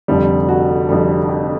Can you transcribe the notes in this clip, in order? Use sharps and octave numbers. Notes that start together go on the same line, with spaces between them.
F1 F2 D3 G3
F#4
F1 F2 D3 G3
G4